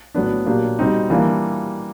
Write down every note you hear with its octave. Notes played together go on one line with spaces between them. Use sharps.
A2 F#3 B3 D4
A#2 F#3 A#3 D4 G4
B2 G3 C4 D#4
E3 G3 A#3 D4 F4